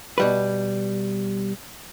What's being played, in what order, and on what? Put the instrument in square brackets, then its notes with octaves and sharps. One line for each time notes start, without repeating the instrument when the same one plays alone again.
[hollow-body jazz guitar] B2 G3 B4